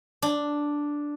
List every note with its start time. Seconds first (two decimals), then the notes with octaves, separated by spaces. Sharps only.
0.22 D4